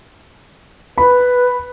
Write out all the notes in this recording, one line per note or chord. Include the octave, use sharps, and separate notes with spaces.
B4 B5